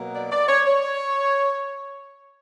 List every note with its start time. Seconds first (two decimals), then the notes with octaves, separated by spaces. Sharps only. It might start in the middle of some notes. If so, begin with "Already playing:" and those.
Already playing: B2 F#3 A#3
0.13 D5
0.31 D5
0.48 C#5
0.66 C#5